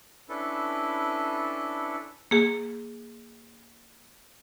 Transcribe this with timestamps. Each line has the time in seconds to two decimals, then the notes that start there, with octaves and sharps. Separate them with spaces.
0.29 C#4 D4 E4 A4 B4
2.31 A#3 G#4